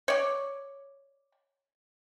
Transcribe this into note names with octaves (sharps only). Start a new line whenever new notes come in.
C#5 D5